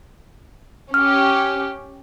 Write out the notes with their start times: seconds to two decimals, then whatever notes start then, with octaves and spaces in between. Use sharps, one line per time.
0.94 C#4 G4 F6